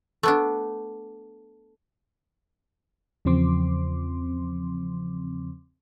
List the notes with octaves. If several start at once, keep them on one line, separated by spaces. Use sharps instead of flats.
A3 B3 D4
E2 C#3 F3 C4 C6 D6